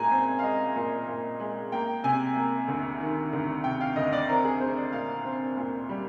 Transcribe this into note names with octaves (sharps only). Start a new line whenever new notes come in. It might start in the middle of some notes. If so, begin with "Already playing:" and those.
Already playing: A#2 G#3 G#5 A#5
C4
F5
G#3 D#5
A#2
A#2
G#3
A#3 G5
C3 G#5
A#3
D2
D#3
D2
C3 G5
F5
D2 D#5
D5
C4 A#4
G#4
C4 C5
D5
A#2 F5
C4
A#2
G3